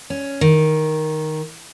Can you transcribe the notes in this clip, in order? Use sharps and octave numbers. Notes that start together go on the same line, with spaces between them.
C#4
D#3